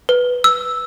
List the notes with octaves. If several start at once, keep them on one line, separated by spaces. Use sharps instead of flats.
B4
E6